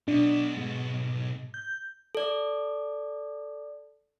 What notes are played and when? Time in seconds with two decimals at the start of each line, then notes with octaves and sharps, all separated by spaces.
0.08 B1 B2 D4
0.57 G#2
1.54 G6
2.15 A4 D5